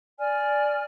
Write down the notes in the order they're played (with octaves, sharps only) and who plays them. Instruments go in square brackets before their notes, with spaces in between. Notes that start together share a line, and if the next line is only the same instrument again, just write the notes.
[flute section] D5 G#5 F6